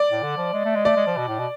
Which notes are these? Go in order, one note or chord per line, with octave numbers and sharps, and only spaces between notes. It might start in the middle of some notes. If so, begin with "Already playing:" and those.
Already playing: D5
A2
D3
F3
G#3
A3
G#3
A3 D5
G#3
F3
B2
A2
B2